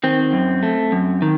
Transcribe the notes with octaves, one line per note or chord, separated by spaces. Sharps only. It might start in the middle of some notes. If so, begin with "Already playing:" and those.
D#3 C4
F#2
A3
F#2
D#3